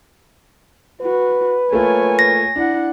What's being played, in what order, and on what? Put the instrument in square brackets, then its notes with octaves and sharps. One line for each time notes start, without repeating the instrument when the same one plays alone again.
[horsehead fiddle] F#4 [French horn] B4
[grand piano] A3 A#3 F4 [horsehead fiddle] C#5 G#5
[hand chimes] A#6
[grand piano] D4 [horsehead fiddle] E4 F#5